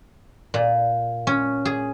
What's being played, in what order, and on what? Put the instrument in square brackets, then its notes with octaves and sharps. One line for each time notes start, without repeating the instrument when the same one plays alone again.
[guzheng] A#2
C#4
G#4